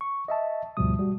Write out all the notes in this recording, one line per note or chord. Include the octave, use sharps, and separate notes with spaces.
C#6
D#5 E5 A5
D2 G#2 B2 F3 G3 D#6
G3 F#4